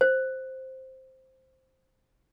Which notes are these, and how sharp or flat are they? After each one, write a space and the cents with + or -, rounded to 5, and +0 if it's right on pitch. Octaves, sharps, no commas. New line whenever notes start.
C5 +0